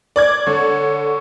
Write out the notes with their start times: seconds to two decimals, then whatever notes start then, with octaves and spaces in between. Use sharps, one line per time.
0.16 D5 D6 G#6
0.47 D3 C#5